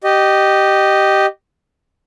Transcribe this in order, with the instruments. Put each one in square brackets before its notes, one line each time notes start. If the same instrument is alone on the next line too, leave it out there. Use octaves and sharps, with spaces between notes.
[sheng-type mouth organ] G4 D#5